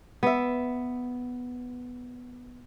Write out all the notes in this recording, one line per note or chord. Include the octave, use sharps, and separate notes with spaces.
B3 E5